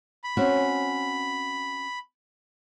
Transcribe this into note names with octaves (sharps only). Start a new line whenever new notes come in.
B5
C4 C#4 F#4